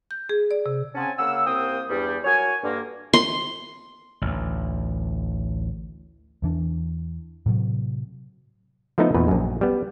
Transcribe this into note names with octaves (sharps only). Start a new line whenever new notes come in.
G6
G#4
D5
C3
C#3 C4 C#4 F#5 G#5 A5
C#3 A#3 F#5 E6
C2 A#3 C4 G5 D#6
E2 G2 G3
F#3 F#4 A#4 C#5 G#5
G2 D3 A#3
C6
A1 D2
E2 E3 D4
A2 C3 F#3
F3 A3 B3 D#4 E4
E2 A#2 B4
A#1 F#2
G3 B3